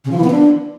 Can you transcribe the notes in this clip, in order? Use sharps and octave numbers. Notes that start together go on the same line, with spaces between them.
C#3
F3
E3
B3
D4